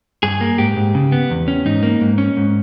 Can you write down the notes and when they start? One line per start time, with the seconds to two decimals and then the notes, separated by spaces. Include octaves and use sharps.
0.23 G2 G#4
0.41 A#3
0.58 G#2 G4
0.76 G#2
0.95 C#3
1.12 B3
1.30 E2
1.48 C#4
1.66 G#2 D#4
1.83 A#3
2.01 G#2
2.18 C#4
2.37 G#2